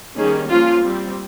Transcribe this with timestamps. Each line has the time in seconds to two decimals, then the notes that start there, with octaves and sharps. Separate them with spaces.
0.16 D#3 G3 A#3 C#4 G#4
0.50 F3 A#3 C#4 F4
0.83 G3 C4